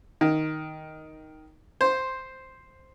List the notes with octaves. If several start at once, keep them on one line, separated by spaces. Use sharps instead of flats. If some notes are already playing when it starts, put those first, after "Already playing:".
D#3
C5